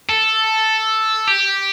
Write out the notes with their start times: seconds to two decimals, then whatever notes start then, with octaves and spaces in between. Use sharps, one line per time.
0.09 A4
1.27 G4